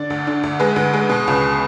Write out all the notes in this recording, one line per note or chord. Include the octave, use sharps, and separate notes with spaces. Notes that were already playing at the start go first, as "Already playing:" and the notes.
Already playing: D3 D5
D2
D3
D2
G#3 B4
D2
G#3
B2
C#2